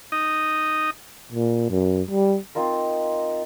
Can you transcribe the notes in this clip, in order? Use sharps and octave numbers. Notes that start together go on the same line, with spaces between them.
D#4 D#5
A#2
F#2
G3
C4 D#4 F4 A#4